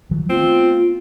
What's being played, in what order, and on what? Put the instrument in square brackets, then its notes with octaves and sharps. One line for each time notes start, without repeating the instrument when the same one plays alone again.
[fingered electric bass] D#3 F3 F#3
[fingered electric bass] A3 B3 [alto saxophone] C4 [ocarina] F4